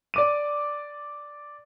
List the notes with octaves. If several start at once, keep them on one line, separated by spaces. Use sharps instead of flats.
D5 D6 D#7